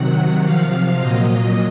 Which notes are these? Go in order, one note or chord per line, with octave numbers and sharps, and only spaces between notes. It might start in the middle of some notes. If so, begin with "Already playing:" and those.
Already playing: C3 D#3 F#3 F#5
C3 F3 F5
A#2 F#3 D#5